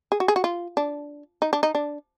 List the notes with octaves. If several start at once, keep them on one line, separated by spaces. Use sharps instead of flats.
G#4
F#4
G#4
F#4
F4
D4
D#4
D4
D#4
D4